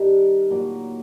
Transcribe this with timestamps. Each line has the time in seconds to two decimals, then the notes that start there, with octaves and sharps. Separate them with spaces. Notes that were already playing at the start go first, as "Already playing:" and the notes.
Already playing: G2 D#3 G3 A#4
0.50 A#2 F#3